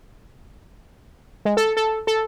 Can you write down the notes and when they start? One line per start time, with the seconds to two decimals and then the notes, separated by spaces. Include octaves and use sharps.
1.45 G#3
1.57 A4
1.77 A4
2.07 A4